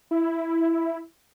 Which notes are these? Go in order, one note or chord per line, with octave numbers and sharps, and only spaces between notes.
E4